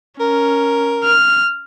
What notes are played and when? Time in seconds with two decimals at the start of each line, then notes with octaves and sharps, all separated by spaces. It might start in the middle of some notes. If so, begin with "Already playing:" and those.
0.20 C#4 A#4
1.04 F6